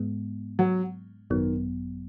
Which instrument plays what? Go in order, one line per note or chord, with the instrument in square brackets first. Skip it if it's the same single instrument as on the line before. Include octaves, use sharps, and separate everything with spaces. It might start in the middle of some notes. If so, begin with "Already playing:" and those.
Already playing: [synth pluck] G#2 G#3 B3
[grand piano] F#3
[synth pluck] G#1 F#2 F#3 B3 [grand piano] D#3